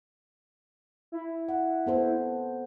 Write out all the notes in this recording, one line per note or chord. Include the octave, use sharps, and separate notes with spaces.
E4
F#5
B3 A4 C5